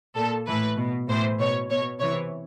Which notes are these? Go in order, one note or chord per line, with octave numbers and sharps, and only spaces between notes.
A#2 A4
A2 E3 B4
B2
A2 E3 C5
B2 C#5
B2 C#5
C3 E3 C#5